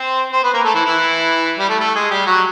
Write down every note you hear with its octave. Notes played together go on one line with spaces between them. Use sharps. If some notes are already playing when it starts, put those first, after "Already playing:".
Already playing: C4 C5
C4 C5
B3 B4
A#3 A#4
A3 A4
E3 E4
E3 E4
G3 G4
A3 A4
A3 A4
G#3 G#4
G3 G4
F#3 F#4